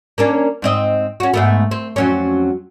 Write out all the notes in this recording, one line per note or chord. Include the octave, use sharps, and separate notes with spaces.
A#3 C#4 D4
G#2 C4 D#5
C#4 F#4
G#2 A3 B3
C4
F2 F#3 C#4